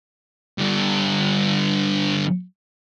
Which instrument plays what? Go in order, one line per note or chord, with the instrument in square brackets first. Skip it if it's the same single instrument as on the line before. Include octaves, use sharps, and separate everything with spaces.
[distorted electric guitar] G2 D3